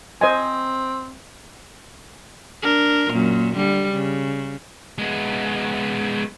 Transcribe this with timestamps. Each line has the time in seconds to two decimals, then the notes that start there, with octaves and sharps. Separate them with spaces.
0.21 C4 C5 D#5 G#5
2.62 D4 A#4
3.11 F#2 A#2
3.56 D3 G3
3.93 C#3
4.98 G#3 B3